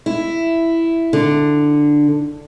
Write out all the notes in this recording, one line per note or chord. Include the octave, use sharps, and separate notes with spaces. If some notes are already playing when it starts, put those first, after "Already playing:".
E4
D3